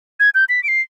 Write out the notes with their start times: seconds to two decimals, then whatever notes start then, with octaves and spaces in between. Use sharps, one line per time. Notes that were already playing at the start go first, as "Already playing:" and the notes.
0.20 G#6
0.35 G6
0.49 B6
0.63 D7
0.68 C7